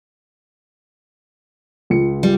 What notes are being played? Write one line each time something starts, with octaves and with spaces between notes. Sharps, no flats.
C#2 F4 C#7
G3